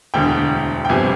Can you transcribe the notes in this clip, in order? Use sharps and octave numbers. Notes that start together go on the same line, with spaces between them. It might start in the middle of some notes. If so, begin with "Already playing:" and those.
E1 D2 D3 G5
G5
G1 F2 C3 G#5